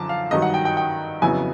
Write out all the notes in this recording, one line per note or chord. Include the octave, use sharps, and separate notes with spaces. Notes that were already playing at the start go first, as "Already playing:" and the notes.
Already playing: F#2 D3 F3 A5 D6
F5
G2 D#3 F#3 D#5
F#5
G5
G5
G5
F2 C#3 F#3 B3 E4 G#5